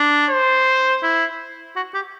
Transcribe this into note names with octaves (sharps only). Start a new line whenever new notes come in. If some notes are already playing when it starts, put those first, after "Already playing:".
Already playing: D4
C5
E4
F#4
G4